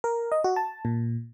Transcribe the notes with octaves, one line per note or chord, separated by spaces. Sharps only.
A#4
D#5
F#4
A5
A#2